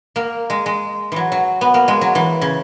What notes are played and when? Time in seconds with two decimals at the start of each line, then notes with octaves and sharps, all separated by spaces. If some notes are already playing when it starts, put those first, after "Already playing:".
0.16 A#3
0.50 G#3
0.66 G#3
1.12 E3 F#3
1.32 F#3
1.61 B3
1.74 A#3
1.88 G#3
2.01 F#3
2.15 E3
2.41 C#3